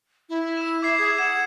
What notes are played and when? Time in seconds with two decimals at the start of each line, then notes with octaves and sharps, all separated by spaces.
0.29 E4
0.57 E6 E7
0.82 E5 D6 G#6 C7
0.98 G#4 G#6
1.18 F#5 E7